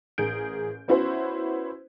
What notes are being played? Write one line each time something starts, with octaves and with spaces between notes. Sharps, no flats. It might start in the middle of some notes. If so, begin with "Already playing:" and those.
A1 G#4 A#4 G6 D7
B3 C#4 E4 F#4 B4 C5